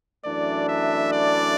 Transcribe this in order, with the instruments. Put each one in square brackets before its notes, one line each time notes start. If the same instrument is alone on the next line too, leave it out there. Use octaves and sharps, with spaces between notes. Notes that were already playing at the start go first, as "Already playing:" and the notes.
[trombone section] F#2 E3 A3 D4 [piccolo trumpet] D5
[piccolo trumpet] E5
D5